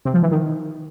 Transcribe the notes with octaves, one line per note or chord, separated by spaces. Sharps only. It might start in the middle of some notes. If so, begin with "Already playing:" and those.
C3
F3
E3
D#3